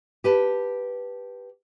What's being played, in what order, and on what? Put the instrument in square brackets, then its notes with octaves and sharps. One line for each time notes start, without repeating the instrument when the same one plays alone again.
[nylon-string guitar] G4 B4 A5